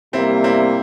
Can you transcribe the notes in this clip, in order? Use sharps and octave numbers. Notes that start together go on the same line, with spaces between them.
C3 G3 A#3 C4 E4
C4 E4